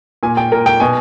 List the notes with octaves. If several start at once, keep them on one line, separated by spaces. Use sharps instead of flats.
A#2 G#5
G5
A#2 A#4
G5
B2 G#5